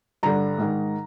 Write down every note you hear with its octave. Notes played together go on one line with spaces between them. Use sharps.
G2 D3 A#5
G#2 D#3